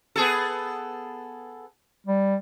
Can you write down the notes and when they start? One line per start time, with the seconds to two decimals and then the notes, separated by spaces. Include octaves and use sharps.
0.16 B3 G#4 A4
2.06 G3